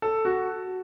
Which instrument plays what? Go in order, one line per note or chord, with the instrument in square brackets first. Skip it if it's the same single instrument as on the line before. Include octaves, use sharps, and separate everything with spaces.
[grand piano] A4
F#4